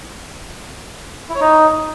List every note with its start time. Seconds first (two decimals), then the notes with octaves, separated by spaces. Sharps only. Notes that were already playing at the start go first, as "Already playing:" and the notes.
1.30 E4
1.35 C#5
1.41 D#4